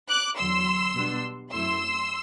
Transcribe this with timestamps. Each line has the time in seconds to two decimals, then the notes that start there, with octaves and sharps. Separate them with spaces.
0.08 D6 F#6
0.37 E2 D3 F#3 C6 E6
0.95 B2 G3 B3 D4
1.52 F#2 F#3 A3 C4 E4 C6 E6